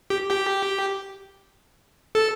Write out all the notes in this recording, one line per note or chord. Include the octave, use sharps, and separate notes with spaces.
G4
G4
A4